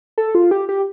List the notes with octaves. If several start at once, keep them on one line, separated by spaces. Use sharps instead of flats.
A4
F4
G4
G4